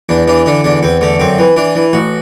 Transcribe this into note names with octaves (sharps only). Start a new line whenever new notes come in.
E2 D4
E3 D4
D3 D4
E2 D4
E2 C4
D3 A3
F#2 C4
E3
E3 D4
E3
A1 F#4